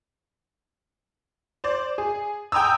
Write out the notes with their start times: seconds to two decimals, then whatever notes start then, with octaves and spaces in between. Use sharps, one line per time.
1.64 C5 D5
1.98 G#4
2.52 G5 G#5 A#5 D#6 E6